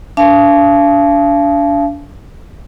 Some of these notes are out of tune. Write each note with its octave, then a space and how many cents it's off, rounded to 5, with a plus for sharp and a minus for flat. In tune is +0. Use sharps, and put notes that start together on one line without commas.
D4 -30 F5 -35 A5 -35